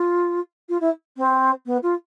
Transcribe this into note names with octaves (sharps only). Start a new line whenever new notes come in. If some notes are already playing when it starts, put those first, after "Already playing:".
Already playing: F4
F4
E4
C4
B3
F4